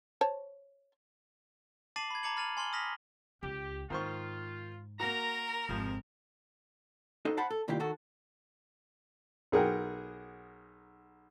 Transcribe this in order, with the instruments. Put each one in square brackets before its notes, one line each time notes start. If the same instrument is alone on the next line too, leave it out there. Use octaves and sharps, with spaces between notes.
[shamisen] C5 C#5 A5
[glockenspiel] A5 D6 A6 C7 D#7 F#7
B5 G#6
A5 A#5 D6 G#6 C#7 F#7
B5 F6 A6 D#7 F7 F#7
G#5 C6 F6 F#7 G7
D#6 F6 A#6 B6 F7
[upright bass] C#2 [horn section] G4
[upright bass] G#2 [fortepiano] D#3 C5 C#6 [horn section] F4
[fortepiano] A#3 F#4 [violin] A#4 [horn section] A#5
[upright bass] G#1 [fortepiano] F2 C3 [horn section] F3
[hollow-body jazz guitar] D#4 F#4 A4 C5 D#5
C5 F#5 A5 B5
A4
C2 A#2 D#3 E4 F4 G4
D#3 F#4 A4
[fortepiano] B1 G#4 A#4 F#5 G5